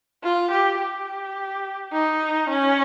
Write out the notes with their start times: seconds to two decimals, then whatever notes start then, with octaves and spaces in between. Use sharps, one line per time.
0.23 F4
0.51 G4
0.80 G4
1.93 D#4
2.49 C#4